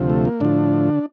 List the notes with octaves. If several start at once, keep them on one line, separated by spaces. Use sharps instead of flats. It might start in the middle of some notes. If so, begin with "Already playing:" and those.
Already playing: D2 C3 F3
A3
A#3
A2 D3 F3 D4